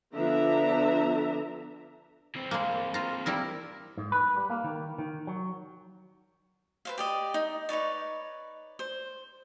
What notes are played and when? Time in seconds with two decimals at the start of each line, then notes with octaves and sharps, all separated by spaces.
0.14 D3 F3 B3 D4 E5 A#5
2.35 E3 C4
2.51 G#3 A#3
2.94 F4 A#5
3.26 G3 E4 A#4
3.98 G#2
4.12 B4
4.36 G3
4.50 A#3
4.64 D#3
4.98 D#3
5.27 F#3
6.85 B4 C5 F5
6.98 G4 D5 D#5
7.34 D#4
7.69 D#4 B4 C#5 D5
8.79 C5